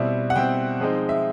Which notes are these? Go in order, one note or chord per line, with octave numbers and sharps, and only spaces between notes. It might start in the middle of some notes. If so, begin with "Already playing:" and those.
Already playing: B2 G3 C4 E4
F#5
B2 G3 C4 E4 G5
F3 G#3 C4 D#4
E5